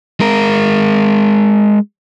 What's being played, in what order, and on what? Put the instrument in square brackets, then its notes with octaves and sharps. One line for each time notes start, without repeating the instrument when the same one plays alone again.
[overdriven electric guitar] G#3 A#4